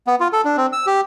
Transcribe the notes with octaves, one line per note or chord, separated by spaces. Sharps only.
B3
F4
A4
D4
C4
E6
G4